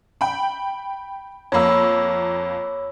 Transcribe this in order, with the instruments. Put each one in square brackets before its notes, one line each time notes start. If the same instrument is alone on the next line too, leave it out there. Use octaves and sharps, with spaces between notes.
[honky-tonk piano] G5 B5
[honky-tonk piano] F2 A#3 [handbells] C#5 B5 E6